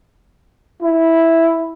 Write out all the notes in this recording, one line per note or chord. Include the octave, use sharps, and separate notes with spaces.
E4